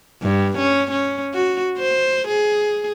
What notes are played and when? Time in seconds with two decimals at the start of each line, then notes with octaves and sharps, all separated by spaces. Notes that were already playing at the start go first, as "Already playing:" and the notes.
0.22 G2
0.58 C#4
0.91 C#4
1.34 F#4
1.78 C5
2.28 G#4